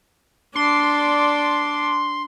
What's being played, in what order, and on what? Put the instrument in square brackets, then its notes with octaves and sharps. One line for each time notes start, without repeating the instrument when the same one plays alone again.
[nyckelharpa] D4 D5 [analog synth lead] C6